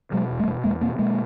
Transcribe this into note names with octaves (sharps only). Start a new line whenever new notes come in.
B2 F#3 G#3
E1
G3 A3
B2
E2 G#3 A#3
B2 A#3 C4
B2 G#3 A#3